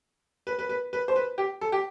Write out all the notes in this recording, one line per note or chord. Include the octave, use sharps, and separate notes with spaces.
B4
B4
B4
B4
C5
B4
G4
A4
G4